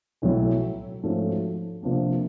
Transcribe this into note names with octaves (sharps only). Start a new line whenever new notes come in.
B1 A2 F#3
G#2 F3 A3 C#4 F#4
C3 F3 A#3 D4